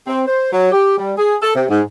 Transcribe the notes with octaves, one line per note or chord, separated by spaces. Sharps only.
C4
C5
F#3
G4
G3
G#4
A4
C3
G#2